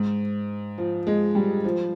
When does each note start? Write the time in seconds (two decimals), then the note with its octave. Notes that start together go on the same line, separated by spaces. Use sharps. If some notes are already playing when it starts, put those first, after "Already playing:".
Already playing: G#2
0.78 F3
1.07 G#3
1.35 G3
1.64 F3